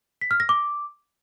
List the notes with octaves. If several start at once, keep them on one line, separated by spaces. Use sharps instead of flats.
B6
F6
A#6
D6